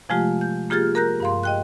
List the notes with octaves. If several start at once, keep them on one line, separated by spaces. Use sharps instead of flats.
C3 F3 G#3 A3 F4 G4
G6
A#3 F4 G4 G#4 F6 A6
A#4 A#5 F#6 G6 A#6
G2 F5 C6
D#5 G5 F#6